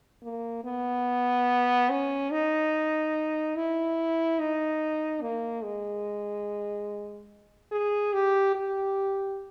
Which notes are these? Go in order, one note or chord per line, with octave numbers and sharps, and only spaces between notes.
A#3
B3
C#4
D#4
E4
D#4
A#3
G#3
G#4
G4
G4